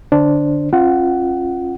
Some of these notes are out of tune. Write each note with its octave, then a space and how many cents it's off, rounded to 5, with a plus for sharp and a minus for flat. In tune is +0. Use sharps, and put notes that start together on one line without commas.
D3 +0 D4 +0 C5 +0
C#4 -35 F4 +0 F#5 +20